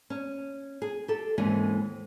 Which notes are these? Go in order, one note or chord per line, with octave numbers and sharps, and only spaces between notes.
C#4
G#4
G4 A4
D#2 G#2 E3 G#3 C4 C#4